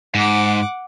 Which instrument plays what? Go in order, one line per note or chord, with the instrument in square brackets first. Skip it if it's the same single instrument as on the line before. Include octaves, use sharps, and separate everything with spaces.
[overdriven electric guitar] G#2 [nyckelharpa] F#5 D6